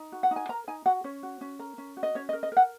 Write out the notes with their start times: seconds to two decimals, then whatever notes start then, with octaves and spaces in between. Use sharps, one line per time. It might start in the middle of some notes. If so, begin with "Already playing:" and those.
Already playing: D#4
0.12 F#4
0.23 F#5
0.31 D#4
0.36 G#5
0.49 A#4 A#5
0.68 D#4 G#5
0.86 F#4 F#5
1.04 C#4 C#5
1.23 F#4
1.41 C#4
1.59 A#4
1.78 C#4
1.97 F#4
2.03 D#5
2.15 C#4 C#5
2.29 D#5
2.33 A#4
2.43 D#5
2.52 A#4 F#5